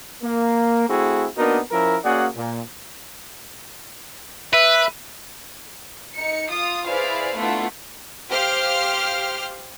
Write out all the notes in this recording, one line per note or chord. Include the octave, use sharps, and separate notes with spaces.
A#3
A3 C4 E4 F#4 G#4
A#3 B3 D4 D#4 F#4 A#4
F3 C#4 E4 A#4
A#3 C#4 F#4 G#4 D5 F#5
A#2
B4 E5
D#4 C#7
F4 D#6
E4 G#4 B4 C5 D5 F5
A3 B3 D4 E4 F4 F#5
G4 C5 F5 F6 C7